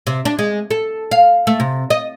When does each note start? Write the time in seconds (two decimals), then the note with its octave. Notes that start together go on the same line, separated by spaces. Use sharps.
0.07 C3
0.25 D4
0.39 G#3
0.71 A4
1.11 F5
1.47 A3
1.60 C3
1.90 D#5